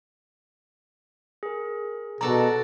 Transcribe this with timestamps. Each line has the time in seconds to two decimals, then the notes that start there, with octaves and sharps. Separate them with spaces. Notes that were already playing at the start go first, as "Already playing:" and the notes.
1.43 G#4 A#4
2.21 B2 F#4 A4 B4 D5 A5 A#5